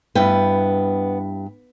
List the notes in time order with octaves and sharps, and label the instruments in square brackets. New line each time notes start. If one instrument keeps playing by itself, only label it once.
[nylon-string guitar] G2 E4 G5 [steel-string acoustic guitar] B3